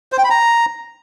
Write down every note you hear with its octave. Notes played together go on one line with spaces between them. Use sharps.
C5
G5
B5
A#5